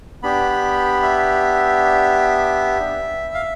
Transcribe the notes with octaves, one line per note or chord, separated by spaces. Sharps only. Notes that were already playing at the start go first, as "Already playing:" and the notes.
B3 D4 G4 B5
E5
F5